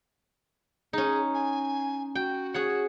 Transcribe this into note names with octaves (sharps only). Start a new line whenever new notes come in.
C#4 D#4 G#4
G#5
F#4 G5
G#4 C#5 F#5